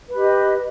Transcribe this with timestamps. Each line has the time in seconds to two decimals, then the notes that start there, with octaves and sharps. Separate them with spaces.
0.09 B4
0.13 G4
0.17 D#5